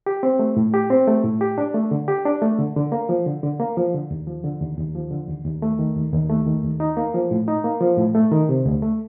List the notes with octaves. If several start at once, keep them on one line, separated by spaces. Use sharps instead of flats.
G4
C4
A3
A2
G4
C4
A3
A2
G4
D4
A3
D3
G4
D4
A3
D3
D3
A#3
F3
D3
D3
A#3
F3
D3
D#2
F3
D3
D#2
D#2
F3
D3
D#2
D#2
A3
D#3
D#2
D#2
A3
D#3
D#2
D#4
A#3
F3
A2
D#4
A#3
F3
A2
A3
D#3
C3
D2
A3